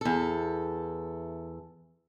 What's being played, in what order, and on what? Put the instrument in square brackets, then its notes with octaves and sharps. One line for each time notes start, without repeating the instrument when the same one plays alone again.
[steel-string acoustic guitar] E2 A4